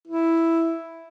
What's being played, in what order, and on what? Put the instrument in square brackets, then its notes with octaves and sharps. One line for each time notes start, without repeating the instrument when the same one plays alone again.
[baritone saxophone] E4